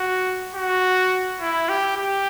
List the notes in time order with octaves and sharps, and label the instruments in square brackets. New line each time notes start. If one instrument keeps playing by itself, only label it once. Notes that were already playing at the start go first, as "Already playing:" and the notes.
Already playing: [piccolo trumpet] F#4
F#4
E4
G4
G4